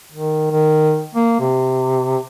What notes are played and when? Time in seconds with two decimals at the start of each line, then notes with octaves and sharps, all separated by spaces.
0.12 D#3
0.51 D#3
1.15 A#3
1.40 C3